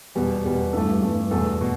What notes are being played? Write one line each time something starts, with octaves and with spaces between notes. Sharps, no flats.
E2 B2 G3 B3
E2 B2 G3 B3
G2 E3 A3 A4
G2 E3 A3
E2 B2 A3 A4
B2